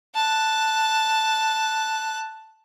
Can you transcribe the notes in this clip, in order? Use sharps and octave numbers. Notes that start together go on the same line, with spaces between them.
A5 F#6